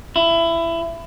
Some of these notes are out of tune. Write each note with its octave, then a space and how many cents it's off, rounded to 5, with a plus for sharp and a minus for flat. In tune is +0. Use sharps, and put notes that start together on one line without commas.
E4 +20